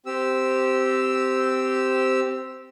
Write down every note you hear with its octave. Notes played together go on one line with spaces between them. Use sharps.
C4 G4 E6